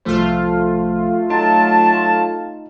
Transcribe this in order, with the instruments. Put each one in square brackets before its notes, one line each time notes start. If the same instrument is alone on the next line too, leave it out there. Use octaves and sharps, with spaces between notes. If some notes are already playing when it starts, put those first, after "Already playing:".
[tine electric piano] C2 F3 C5 [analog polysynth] A3 F4
[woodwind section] F#3 A5 [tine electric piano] D#4